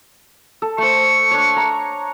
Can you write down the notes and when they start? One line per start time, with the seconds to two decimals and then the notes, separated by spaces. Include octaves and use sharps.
0.62 A4
0.78 A3 C5 C#6
1.31 D4 C#5
1.57 A#5